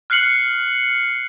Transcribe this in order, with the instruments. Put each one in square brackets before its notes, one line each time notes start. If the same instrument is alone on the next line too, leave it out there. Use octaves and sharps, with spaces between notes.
[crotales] F6 F#6 C7 C#7 F#7